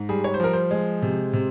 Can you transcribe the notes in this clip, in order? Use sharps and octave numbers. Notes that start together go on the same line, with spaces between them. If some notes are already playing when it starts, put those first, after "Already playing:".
Already playing: G#2
G3 G#4
C#5
C5
F3 A#4
C5
G#3
C3
C3